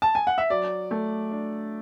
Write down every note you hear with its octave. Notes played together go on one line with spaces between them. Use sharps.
A5
G#5
F#5
E5
F#3 D5
A3
D4